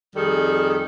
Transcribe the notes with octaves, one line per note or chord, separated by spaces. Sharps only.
F2 D#3 G3 G#4 A4